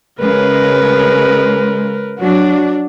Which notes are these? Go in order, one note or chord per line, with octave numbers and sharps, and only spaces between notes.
C#3 G#3 A#4 B4
F#3 D4 F#4